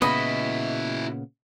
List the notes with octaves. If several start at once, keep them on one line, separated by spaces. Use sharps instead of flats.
A#2 C#3 B3 E4 F#4 D#5 B5